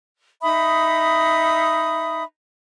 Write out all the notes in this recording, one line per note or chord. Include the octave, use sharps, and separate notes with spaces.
D#4 E5 B5 D#6